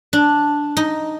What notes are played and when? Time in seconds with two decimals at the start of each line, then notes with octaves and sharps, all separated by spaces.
0.13 D4
0.77 D#4